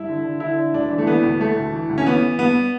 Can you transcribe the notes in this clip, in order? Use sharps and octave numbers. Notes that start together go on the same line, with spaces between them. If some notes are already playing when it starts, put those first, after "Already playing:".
Already playing: G2 E4
D3
D3
D3 E4
D3
D2 D4
E3
A3
E3 B3
D2
E3 A3
D2
E3
D2
C#4
E3 B3
E3
G2 B3